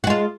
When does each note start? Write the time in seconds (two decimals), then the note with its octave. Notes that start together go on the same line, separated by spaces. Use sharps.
0.04 F#4
0.07 G#3
0.10 F4